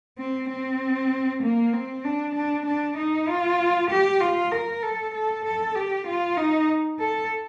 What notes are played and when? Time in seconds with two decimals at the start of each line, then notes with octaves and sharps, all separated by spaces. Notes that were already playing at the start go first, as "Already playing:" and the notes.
0.18 C4
0.49 C4
1.42 A#3
1.73 C4
2.04 D4
2.35 D4
2.65 D4
2.97 D#4
3.28 F4
3.90 G4
4.20 F4
4.52 A#4
4.82 A4
5.14 A4
5.45 A4
5.75 G4
6.07 F4
6.37 D#4
6.99 A4